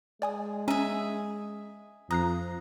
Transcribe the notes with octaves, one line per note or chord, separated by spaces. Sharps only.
G#3 D5 G#5 D#6
C#4 G#4 E5 A#5 D#7
F2 F3 A#5 D#6 F#6 C7